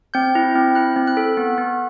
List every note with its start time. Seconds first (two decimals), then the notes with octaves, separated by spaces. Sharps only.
0.14 C4 G6
0.35 E4
0.55 C4
0.75 E4 F#6
0.96 C4
1.07 F#6
1.17 A4
1.37 B3
1.58 B3